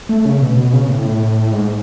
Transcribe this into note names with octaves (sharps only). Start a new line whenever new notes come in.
A3
C#3
B2
B2
C#3
A2
G#2